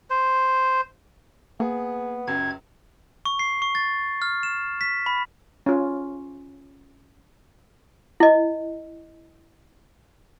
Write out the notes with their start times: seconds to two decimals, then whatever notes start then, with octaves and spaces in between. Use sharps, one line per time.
0.10 C5
1.60 A#3 B3 G#4
2.27 C#2 F#2 G#6
3.25 C#6
3.39 C7
3.62 C#6
3.75 A6
4.22 F6
4.43 E7
4.81 B6
5.06 B5
5.66 C#4 F4
8.20 E4 D#5